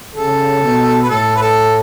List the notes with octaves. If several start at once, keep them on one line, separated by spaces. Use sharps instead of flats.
C#3 A4
B2
B4
A2 A4
B4
A4